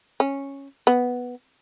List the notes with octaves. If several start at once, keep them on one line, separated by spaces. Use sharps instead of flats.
C#4
B3